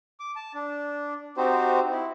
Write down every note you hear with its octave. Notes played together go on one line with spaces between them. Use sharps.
D6
A5
D4
C4 D#4 F#4 G4 C5
E4